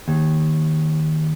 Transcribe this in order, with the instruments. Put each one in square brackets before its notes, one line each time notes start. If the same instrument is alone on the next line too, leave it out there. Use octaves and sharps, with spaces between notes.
[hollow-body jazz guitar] D#2